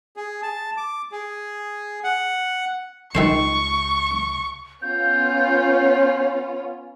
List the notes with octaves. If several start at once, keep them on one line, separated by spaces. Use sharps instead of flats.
G#4
A5
D6
G#4
F#5
C#2 D#3 A4 C5 C#6
B3 C#4 F4 G6